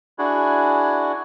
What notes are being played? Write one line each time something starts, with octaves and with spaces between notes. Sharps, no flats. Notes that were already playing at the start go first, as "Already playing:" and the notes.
D4 E4 F#4 G#4